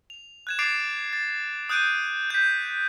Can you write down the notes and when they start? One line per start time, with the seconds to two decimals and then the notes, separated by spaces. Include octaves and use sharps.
0.10 F7
0.47 F#6 G#6 E7
0.59 D6 A6 C7 D7 E7 F7
1.13 A6
1.69 D#6 F#6 G6 D7 D#7
2.30 G6 B6